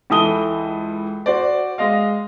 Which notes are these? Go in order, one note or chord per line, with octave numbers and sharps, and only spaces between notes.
C#2 E3 A4 D#6 G7
F#4 C5 D5
G#3 D#5 F5